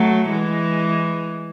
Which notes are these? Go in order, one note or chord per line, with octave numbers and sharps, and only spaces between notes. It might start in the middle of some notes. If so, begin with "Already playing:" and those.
Already playing: F#3 A3
E3 G#3